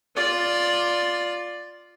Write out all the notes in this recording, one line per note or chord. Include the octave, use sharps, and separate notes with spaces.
F4 D5